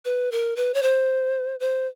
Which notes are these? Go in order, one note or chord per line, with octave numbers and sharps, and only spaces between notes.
B4
A#4
B4
C#5
C5
C5